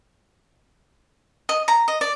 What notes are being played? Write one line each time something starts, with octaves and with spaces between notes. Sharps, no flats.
D#5
A#5
D#5
D5